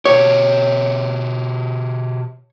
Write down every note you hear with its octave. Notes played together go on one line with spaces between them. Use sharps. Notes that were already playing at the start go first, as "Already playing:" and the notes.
B2 G4 C#5